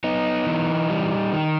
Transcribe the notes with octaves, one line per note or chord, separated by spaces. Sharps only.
B3 D#4
E3
G3
D#3